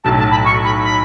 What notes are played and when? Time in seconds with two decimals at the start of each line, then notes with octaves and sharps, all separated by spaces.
0.04 B1 A2 F#3 A5
0.18 A5
0.31 B5
0.45 C#6
0.64 B5
0.84 B5